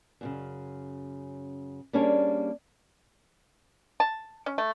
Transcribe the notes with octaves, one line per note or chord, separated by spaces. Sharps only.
F#2 A#2 C#3
G3 A#3 C#4 D4 G#4 C#5
A5
C#4
A3